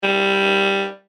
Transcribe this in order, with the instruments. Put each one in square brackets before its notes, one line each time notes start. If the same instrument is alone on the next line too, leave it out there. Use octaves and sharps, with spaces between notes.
[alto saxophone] G3